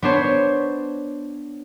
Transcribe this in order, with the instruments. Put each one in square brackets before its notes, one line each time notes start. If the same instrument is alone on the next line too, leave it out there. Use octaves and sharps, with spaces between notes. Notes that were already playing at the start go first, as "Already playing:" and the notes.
[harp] B3 D4 C5 C#5